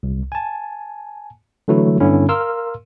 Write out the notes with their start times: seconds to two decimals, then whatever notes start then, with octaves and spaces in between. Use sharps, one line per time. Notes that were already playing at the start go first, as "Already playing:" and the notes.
0.03 C2
0.32 G#5 A5
1.68 D3 E3 F#3 A3 E4
2.00 G2 D3 B3 C#4 E4
2.29 A#4 F5 C6 E6 F6